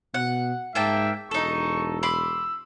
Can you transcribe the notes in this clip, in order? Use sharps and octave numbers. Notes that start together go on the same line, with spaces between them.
B2 F#5
G#2 A#3 E5 G5 A5
E1 D#4 A4 C#6
B5 C6 D6 E6